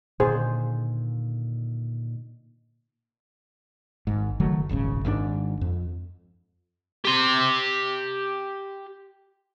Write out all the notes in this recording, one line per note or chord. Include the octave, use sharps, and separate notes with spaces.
A#2 D3 D#3 G#4 C5
G#1 G#2
F#1 D#3 F#3 A3
D#1 G#1 C#2 C#3
G#1 G#2 C#3 D4
F2
G4 C6